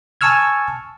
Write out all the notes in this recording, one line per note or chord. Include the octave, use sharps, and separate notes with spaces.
G#5 A5 C#6 E6 F6 G#6